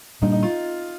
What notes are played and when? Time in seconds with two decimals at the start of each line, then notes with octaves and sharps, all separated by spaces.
0.22 A#2 G3 A#3 D4 D#4
0.32 D#4
0.43 F4